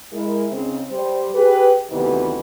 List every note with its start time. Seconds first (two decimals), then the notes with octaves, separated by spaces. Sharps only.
0.12 G#3 E4 A#4
0.51 C#3 C4 D#4
0.90 G3 C5
1.32 G4 G#4 B4
1.91 D2 C3 D#3 E3 G3 B3